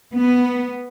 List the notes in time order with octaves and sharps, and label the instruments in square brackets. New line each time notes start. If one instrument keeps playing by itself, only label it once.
[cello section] B3